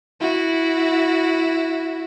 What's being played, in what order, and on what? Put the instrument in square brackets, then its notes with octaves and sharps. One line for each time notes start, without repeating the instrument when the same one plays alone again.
[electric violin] E4 F#4